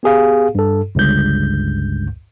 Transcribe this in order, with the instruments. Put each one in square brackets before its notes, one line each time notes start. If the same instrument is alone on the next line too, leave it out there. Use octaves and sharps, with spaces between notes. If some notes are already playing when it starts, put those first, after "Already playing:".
[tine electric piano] B3 G4 G#4 F5
G2 A4
G1 C#2 G2 G6